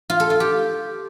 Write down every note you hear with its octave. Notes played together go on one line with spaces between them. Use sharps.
F4
A4
F4
G4